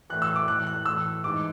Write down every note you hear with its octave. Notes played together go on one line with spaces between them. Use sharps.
A2 E3 F#6
E6
D6
A2 E3 F#6
F#6
A2 E3 E6
G#2 E3 D6